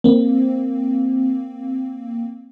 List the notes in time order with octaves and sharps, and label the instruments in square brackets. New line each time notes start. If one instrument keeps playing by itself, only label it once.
[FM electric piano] A#3 C4